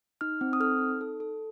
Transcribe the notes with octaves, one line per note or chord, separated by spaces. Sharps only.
D#4 F6
C4
D#6
A4 F6
D#4
A4
A4